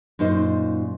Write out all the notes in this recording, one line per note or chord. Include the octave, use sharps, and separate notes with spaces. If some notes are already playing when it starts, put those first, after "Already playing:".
F#2 A#2 D#4 C5